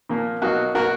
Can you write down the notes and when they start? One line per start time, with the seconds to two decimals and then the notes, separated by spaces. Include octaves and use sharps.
0.09 A#2 F3 A#3
0.42 B2 F#3 A#3 D#4 F#4
0.75 B2 A#3 F#4 A#4